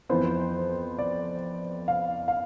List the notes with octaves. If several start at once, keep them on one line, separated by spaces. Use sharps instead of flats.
F2 E3 B3 C5
D5
F5
F5